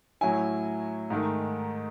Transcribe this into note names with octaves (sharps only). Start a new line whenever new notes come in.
A2 F#3 C#4 E4 G#5
G#2 D#3 A3